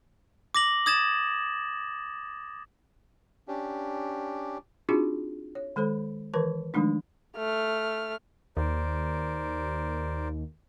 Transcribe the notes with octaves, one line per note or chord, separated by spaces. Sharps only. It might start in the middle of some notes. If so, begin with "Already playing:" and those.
D6 A#6 F#7
D#6 G#6 A6 E7
C#4 D4 G4
C4 D4 D#4 F4 F#4 G#4
C#5
D#3 G#3 A4 C5 B5
D#3 E3 A#4 B4 A5 C#6
D#3 F3 G#3 A3 D4 D#4
A3 F6
D#2 A#4 C5 D5